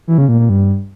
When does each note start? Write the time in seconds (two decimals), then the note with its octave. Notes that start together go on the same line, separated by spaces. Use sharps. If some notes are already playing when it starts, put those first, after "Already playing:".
0.08 E3
0.18 C#3
0.29 A#2
0.39 A#2
0.49 G2